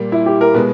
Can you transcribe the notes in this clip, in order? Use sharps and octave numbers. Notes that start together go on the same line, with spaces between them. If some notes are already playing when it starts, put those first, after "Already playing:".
Already playing: A#2 G3 A#3
E4
G4
A#4
B2 G#3 B4